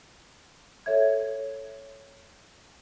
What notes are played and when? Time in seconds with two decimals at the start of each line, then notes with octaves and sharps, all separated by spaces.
0.86 A4 C#5 E5 G#6